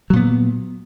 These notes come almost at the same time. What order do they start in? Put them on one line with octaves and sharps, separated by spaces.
F#3 A#2 B3